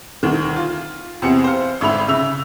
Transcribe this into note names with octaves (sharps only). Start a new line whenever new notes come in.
D2 D#3
F4
E2 C3 C4 C#7
C5 F5
G1 G#2 E5 B5 F7
C#3 E5 E6 F7